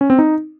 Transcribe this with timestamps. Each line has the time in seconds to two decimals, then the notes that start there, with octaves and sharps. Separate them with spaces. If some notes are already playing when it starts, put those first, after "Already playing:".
0.01 C#4
0.10 C4
0.19 D#4